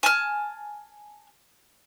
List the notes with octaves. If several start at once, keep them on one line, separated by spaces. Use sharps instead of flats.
G#5 A5 F6